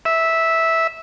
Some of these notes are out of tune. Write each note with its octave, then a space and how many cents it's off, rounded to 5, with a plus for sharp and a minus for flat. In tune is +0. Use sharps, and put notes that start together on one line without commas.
E5 -10